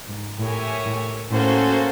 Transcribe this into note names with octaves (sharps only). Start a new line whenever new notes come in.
G#2
A2 G4 A#4 C#5 E5 G#5
A2
A2 A#3 C#4 F#4 A4 C5